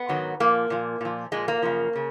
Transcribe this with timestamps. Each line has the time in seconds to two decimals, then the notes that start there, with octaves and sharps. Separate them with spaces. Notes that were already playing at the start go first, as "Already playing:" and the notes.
Already playing: B3
0.09 G#2 D#3 F#3
0.40 A#2 F3 A#3
0.70 A#2 F3
1.01 A#2 F3
1.32 A#2 F3 G#3
1.48 A#3
1.62 F#2 C#3 F3
1.95 C#3